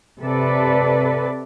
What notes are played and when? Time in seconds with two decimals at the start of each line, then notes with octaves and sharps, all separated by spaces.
0.22 C3 A4 B4 D5